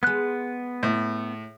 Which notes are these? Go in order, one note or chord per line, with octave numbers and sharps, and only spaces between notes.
G#3 B3 C6 F#6
A2